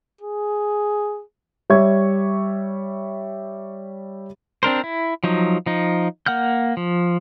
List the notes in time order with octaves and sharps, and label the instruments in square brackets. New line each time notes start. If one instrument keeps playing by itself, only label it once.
[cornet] G#4
[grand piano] G3 C#5 E5 C#6 G#6
[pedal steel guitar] C4 D4 A#4 C5
E4
F3 F#3 D#4
F3 D#4
A#3 F#5 F6 G6
F3